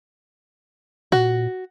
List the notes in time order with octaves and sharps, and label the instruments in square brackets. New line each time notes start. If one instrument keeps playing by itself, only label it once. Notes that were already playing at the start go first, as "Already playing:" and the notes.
[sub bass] A#2 [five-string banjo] F#4